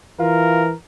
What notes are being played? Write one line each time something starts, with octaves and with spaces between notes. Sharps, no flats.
E3 F4 A#4